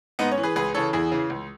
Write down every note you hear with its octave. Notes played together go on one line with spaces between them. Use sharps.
G#2 B3 D#4
C#4
E3
G#4 B4
C#2 G#4 B4
C#3 E3 A4 C#5
E2 E4 G#4
C#3 E3
C#2